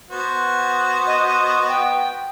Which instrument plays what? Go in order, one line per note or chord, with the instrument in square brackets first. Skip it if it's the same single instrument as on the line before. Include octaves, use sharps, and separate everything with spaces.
[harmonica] B3 F#4 C5
[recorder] D#5
G5